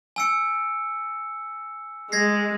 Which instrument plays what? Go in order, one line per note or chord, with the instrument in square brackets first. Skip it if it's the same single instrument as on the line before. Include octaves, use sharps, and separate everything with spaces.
[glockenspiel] G#5 E6 C#7
[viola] G#3 [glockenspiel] G#6 A#6 C7